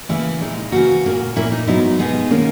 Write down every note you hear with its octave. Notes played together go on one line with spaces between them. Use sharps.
C#3 E3 A#3 E4
A#2 G#3 D#4
C#3 E3 A#3 F#4
A#2 A#3 C#4
A#2 A#3 C#4 E4
D#4
G#2 F#3 B3 D#4 E4
B2 G#3 B3 D#4 G#4
D#3 A#3 C#4